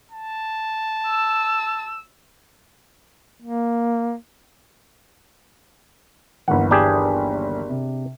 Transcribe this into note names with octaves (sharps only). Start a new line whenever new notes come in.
A5
E6
A#3
G1 D#2 E3 F#5
D4 G4 G#4
C3